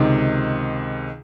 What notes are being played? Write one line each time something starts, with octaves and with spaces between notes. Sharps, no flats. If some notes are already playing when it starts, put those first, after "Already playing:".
Already playing: C#2 C3 D#3